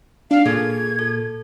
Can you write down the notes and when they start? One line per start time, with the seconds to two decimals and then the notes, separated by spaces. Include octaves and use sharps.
0.31 D4 F5
0.46 A#2 G#4 A4 G#6
0.99 A4